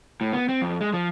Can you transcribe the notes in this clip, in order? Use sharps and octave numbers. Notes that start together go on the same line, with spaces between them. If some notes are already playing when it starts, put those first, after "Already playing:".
A2
B3
C4
F2
G#3
F3